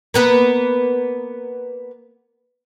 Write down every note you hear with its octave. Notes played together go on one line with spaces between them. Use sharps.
A#3 B3 B4